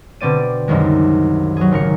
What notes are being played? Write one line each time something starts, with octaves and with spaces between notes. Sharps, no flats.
B2 D3 C4 D5 D#7
C2 F#2 D#3 G#3
F#3 G#4
G#1 C#3 A#4 C#7